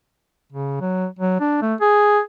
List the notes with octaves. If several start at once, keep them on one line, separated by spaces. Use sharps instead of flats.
C#3
F#3
F#3
D4
A3
G#4